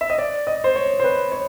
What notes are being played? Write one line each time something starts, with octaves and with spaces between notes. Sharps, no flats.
E5
D#5
D5
D#5
C5
C#5
C5
B4
C#5